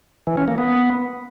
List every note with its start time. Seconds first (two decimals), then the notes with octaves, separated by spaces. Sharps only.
0.27 E3
0.37 C#4
0.48 A#3
0.58 B3